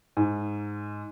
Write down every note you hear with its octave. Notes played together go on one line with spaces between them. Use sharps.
G#2